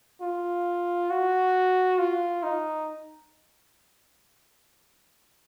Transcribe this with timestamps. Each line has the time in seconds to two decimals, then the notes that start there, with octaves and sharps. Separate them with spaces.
0.21 F4
1.11 F#4
1.99 F4
2.43 D#4